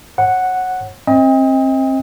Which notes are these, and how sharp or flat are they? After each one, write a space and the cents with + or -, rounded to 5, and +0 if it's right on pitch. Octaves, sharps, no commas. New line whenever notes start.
C#5 -25 F#5 +0
C4 +30 D#5 +30 G5 +40